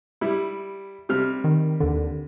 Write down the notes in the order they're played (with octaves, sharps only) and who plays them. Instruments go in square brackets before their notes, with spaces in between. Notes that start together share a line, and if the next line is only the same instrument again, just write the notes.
[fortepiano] G3 E4
C3 G3 F6
[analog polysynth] D#3
D#2 D3